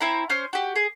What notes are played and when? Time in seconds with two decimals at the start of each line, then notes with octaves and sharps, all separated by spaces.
0.01 C4 E4 A#5
0.30 C#4 C5 F6
0.53 F#4 G4
0.76 G#4